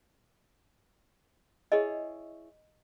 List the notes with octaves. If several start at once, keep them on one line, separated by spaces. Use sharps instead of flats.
E4 G#4 C#5 D#5